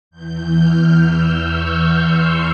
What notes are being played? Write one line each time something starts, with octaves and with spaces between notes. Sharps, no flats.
E2 E3 G6
F6
E6
C#6
C6